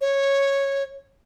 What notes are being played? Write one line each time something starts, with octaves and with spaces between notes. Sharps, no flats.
C#5